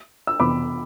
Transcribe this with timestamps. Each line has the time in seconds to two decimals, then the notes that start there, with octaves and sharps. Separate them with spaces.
0.27 E6
0.40 F2 C3 E3 B3 B5 D6